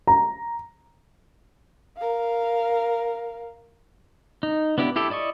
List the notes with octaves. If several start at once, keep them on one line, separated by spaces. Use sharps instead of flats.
A#5
A#4 F5
D#4
B3 D4 E4 G4
E4 G4 A4
E4 D5 D#5 C#6